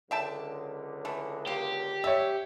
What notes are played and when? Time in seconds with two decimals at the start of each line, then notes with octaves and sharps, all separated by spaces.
0.11 C#2 F#2 D3 E5 G5 A5
1.05 E3 A3
1.47 A#3 G4
2.04 G3 C#5 E5